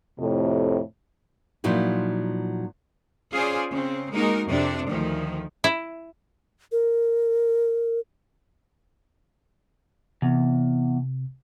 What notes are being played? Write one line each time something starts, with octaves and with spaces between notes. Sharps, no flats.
F2 A2 C3
A#2 F3 F#3 D#4 E4
C#4 F4 G#4 C5 D5
C#3 C4
G#3 A#3 D#4 F#4 A#4
F2 C3 D4
D2 D#3 F3
E4
A#4
E2 C3